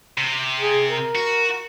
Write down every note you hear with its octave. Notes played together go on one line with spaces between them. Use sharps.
C3
G#4
A#4
F#4